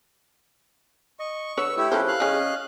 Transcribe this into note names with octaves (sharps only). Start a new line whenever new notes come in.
D#5 C#6
D3 B4 C#5 E6
A3 E4 G4 E6
F3 C#4 A4 B4 C5
F5 F#6
C#3 C#4 G#4 D#5